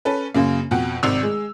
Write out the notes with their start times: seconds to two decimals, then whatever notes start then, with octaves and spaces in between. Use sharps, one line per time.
0.05 C#4 A4 B4
0.34 F#2 C#3 A#3
0.71 F2 B2 F#5 G5
1.03 G#1 C3 D#3 D5 E6 F7
1.23 G#3